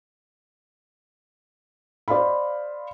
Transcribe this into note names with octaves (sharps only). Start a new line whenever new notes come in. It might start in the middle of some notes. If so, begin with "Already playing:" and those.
C5 D5 D#5 F5 B5